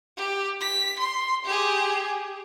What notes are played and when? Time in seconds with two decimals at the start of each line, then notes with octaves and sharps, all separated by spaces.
0.17 G4
0.61 B6
0.99 C6
1.45 G4 G#4